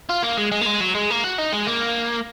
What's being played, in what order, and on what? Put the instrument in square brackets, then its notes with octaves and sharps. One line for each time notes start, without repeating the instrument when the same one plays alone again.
[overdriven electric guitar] F4
A#3
G#3
G#3
A#3
G#3
F#3
G#3
A#3
F#4
D#4
G#3
A#3